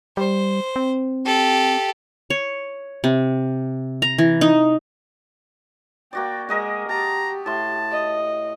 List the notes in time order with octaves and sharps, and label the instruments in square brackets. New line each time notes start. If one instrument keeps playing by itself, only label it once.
[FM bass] G3 [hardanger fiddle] C5
[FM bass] C4
[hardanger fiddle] G4 A4
[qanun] C#5
C3
A#5
E3
D#4
[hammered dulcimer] A#3 F#4 D5 [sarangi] G5
[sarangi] G#3 [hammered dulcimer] A#4 D#5 F#5
[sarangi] G4 [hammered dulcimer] A5 [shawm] A#5
[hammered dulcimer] A2 C6 [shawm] A5
[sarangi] D#5